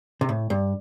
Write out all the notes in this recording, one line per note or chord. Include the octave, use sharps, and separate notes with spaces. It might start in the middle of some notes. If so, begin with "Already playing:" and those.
C3
A2
G2